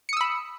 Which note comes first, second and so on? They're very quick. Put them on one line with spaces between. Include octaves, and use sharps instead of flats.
C#7 D#6 E6 B5